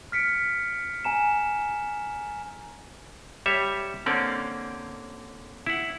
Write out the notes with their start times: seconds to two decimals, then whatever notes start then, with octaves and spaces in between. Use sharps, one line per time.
0.12 F6 B6 C#7 D7
1.05 G#5 A#5 E7
3.46 G3 C#5 E5
4.06 D3 A#3 C4 C#4 D5
5.66 E4 F#5